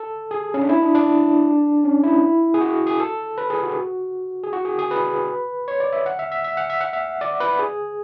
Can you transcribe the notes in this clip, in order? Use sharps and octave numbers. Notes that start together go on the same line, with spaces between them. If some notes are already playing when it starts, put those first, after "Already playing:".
Already playing: A4
G#4
C#4
D4
E4
D4
D4
C#4
E4
G#4
F#4
G#4
A4
B4
G#4
F#4
G#4
F#4
G#4
G#4
B4
C#5
D5
E5
F#5
E5
E5
E5
F#5
E5
F#5
E5
D5
B4
G#4